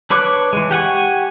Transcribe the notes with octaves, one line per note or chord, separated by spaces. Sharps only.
D4 B4 C#5 D6 F#6
E3 G#3
G4 F#5 G#5 C#6